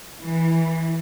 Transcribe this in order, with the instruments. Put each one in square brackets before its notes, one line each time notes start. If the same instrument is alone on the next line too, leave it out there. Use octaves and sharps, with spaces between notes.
[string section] E3